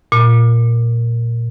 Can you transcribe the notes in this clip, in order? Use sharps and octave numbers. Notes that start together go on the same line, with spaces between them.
A#2